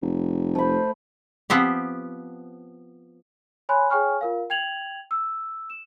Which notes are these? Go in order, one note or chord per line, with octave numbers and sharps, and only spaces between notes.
F1
A3 C5 B5
F3 B3 C4 G4
C#5 G#5 B5 C6 F#6
G#4 C#5 G5 G#5 C#6 F6
F4 A#4 F5
G5 G#6 F7 F#7
E6
E7